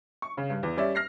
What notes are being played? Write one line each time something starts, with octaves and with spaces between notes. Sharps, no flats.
C#6
C#3
G2
E2
G3 C#4 D5 E5
F6 A#6 C7